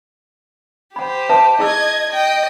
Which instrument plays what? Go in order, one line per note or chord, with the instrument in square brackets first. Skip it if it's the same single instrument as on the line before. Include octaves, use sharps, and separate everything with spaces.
[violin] G4 C5 [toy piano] F#5 B5
[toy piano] B4 E5 A5
[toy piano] E4 G#4 E6 [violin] D#5 G#6
[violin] D#5 G5